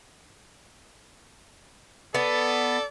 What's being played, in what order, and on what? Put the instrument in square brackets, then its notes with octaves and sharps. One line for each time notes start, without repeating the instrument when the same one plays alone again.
[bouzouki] B3 [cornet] A4 [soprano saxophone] D5